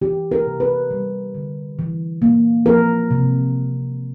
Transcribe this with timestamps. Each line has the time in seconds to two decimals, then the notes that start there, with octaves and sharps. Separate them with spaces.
0.01 E3 G4
0.32 A#4
0.46 C3
0.60 B4
0.91 G3
1.34 D3
1.79 E3
2.22 A#3
2.66 F3 A#4
3.11 C3